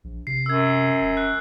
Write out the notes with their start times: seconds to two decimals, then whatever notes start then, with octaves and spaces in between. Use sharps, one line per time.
0.04 A#1
0.27 C3 C7
0.46 F#2 E6 G#6
1.01 E1
1.17 F#6